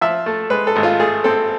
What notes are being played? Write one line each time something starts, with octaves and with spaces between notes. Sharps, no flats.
F3 E5
A3
G#3 B4
A4
G#1
F4
A3 G#4
C4 A4